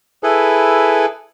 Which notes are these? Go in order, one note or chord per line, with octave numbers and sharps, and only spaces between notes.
E4 G#4 A4 B4